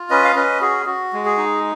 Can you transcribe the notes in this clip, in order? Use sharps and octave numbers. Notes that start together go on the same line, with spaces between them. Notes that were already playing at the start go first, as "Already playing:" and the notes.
Already playing: F4
C#4 B4 D#5
F5
C#4 B4 D#5
F#4 G#4
F#4
G#3
G#4
D#4